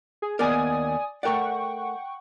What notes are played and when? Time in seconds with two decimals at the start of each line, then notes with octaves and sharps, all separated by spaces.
0.22 G#4
0.39 D#2 B3 A#4 D5 G#5 D#6
1.23 A3 A#4 D5 F#5 G5 C#6